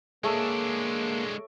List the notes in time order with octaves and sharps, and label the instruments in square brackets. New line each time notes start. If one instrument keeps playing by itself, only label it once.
[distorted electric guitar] G#3 D4 [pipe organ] A#3 [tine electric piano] G#4 [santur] A4 C#5 E5